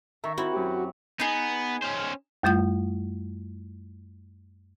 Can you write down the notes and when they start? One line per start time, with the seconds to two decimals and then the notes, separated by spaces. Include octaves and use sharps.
0.24 D#3 E5 A#5 C#6
0.37 C4 E4 F#4
0.52 F#2 G4
1.20 B3 D#4 G#4
1.82 C#4 C5
2.43 F#2 G3 A3 F4 G6